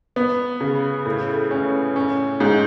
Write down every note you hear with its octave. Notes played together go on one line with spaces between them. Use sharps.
B3
C#3
A2
C#4
C#4
G#2